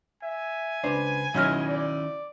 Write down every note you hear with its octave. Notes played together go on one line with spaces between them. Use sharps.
E5 G#5
C#2 D4 B4 C5
B1 D#3 C#4 D#4 E4 D#5 F6
D5